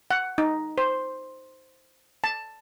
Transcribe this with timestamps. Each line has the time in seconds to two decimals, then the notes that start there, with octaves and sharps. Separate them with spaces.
0.11 F#5
0.38 D#4
0.78 C5
2.24 A5